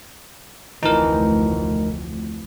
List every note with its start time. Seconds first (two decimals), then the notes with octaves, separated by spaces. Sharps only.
0.83 F1 D2 E3 F3 C4 D#4 A#4